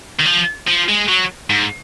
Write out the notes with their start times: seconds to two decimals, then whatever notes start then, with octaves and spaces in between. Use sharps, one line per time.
0.20 D#3
0.25 F3
0.67 F3
0.88 G#3
1.08 F#3
1.50 G#2